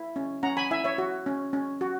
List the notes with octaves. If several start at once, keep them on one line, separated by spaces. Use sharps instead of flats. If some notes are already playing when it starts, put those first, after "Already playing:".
Already playing: E4
C#4
C#4 F#5 A#5
G#5 B5
E4 E5 G#5
C#5 E5
F#4
C#4
C#4
F#4